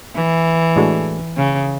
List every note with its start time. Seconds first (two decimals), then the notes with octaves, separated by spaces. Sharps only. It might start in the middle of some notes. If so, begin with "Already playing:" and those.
0.15 E3
0.76 A2 G#3 D4 F#4 A4
1.37 C#3